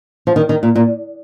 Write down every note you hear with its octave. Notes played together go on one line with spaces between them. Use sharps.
F3
D#3
D#3
A#2
A#2